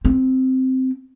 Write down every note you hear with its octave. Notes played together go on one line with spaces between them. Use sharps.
C4